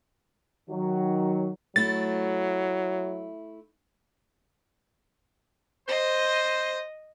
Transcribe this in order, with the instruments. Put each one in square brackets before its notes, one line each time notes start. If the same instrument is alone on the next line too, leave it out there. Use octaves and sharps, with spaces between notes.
[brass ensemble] D#3 F#3
[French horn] F#3 [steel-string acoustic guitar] A3 E4 [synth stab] A6
[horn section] C5 [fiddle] D#5